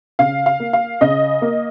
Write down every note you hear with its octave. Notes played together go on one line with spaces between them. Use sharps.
C#3 F5
F5
A#3
F5
C#3 D#5
A#3